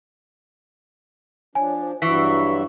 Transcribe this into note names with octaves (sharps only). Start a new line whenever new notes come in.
F3 D4 C#5 G#5
C5
G2 E3 F#3 E5 C#6 B6